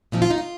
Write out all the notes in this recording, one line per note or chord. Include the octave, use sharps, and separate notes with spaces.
A#2 F3 C4 D#4
F4
D#4
F4